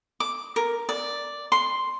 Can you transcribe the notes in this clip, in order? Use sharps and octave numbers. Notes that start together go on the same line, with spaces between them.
D6
A#4
D5
C6